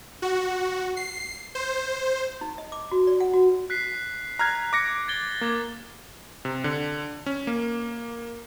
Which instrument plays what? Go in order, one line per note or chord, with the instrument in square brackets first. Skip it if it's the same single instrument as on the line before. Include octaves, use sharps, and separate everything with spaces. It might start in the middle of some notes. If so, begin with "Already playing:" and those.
[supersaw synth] F#4
C7
C5
[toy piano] D#4
D#5
D6
F#4
D5
F#5
F#4
[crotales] F#6 B6 C7
[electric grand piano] A#5 F6 G#6 [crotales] F#6
[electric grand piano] D6 A#6 C#7
[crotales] G#6 A6 G7
[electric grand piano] A#3 [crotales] D6 G#6 A6
[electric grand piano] C3
D3
C#4
A#3